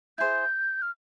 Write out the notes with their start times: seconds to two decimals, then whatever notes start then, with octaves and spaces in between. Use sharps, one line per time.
0.18 E4 G#4 C5 G6
0.82 F6